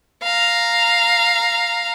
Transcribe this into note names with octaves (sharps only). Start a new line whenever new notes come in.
F5 A#5